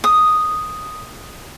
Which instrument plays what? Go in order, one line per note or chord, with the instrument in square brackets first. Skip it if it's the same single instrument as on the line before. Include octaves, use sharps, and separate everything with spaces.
[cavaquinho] D#6